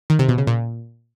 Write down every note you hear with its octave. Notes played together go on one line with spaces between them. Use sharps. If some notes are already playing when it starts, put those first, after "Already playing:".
D#3
C3
B2
C#3
A#2